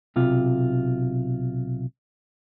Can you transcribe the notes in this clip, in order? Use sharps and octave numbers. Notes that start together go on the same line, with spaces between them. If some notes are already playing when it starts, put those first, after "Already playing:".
B1 C3 F4